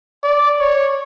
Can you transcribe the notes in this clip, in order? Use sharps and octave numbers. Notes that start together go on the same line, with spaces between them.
D5
C#5